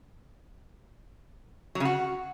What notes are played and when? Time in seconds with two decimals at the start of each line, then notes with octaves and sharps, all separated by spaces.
1.75 F#3
1.80 C#3
1.85 F#4